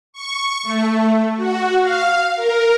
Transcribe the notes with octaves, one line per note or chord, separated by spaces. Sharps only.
C#6
A3
F#4
F5
A#4